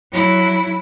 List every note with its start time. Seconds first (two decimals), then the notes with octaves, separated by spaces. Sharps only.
0.12 F#3 E4